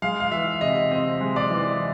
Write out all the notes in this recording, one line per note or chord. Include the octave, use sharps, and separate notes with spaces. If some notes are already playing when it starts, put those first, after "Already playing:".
G#3 F5
F5
E3 E5
C3 D#5
C4 D#5
G#3
D5
E3